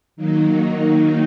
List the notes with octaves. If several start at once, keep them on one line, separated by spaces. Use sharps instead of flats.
D#3 F#3 A#3 D#4